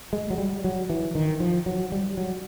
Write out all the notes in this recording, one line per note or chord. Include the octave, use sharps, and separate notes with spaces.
G#3
F#3
G3
F#3
E3
D#3
F3
F#3
G3
F#3